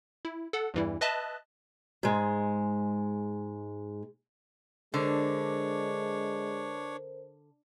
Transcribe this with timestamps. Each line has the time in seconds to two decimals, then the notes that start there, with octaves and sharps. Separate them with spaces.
0.25 E4
0.53 A4 F#5
0.74 E2 G2 E3 G3 E4
1.01 B4 D#5 E5 A5 F#6
2.03 G#2 G#3
4.94 D3 G#3 D4 A#4 C5 C#5